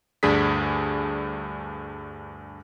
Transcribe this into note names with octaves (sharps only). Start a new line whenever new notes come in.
D2 G2 D4 G#4 B6